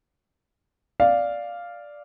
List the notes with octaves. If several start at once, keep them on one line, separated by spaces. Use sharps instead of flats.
D5 F5